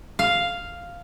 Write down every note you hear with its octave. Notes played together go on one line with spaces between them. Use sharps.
F5